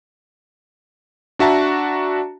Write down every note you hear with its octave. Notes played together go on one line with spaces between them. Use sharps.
D4 F#4 E5 A5 A#5